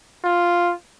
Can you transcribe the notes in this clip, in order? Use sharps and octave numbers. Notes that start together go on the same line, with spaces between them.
F4